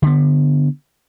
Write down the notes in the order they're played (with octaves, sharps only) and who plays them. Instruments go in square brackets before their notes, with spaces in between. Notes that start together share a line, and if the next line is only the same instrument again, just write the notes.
[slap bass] D3 B3